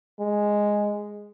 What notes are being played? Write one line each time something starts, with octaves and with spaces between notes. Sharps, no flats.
G#3